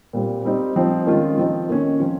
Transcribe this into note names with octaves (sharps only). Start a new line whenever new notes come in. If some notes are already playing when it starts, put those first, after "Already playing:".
A#2 G3 C4
G3 C4 D#4
F3 C4 D#4
D#3 G#3 C#4 F4
F3 C4 D#4
D#3 A#3 C#4
F3 C4 F4